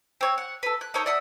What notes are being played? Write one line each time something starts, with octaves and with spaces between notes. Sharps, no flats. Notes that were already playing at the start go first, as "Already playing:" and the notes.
C4 C#5
F#5
A4 B4
F#6
D#4 A4 A#4 C#5
D5 E5 F#5 D#6